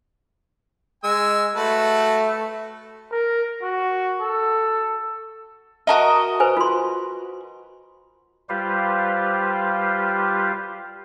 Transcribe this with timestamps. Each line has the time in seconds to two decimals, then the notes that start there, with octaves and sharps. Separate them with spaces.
1.04 G#3 G#5 E6
1.56 A3 F#4 B4 A5
3.12 A#4
3.63 F#4
4.22 A4
5.87 F#4 A#4 D#5 E5 A5
6.40 B4 C5 G#5
6.57 F4 C6
8.49 G3 F4 G4 B4 C5 F5